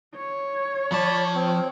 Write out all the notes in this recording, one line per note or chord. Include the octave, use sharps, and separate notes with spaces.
C#5
F3 D5 A5 B5
C4